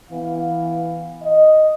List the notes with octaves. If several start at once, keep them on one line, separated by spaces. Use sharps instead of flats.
E3 B3 F5
D#5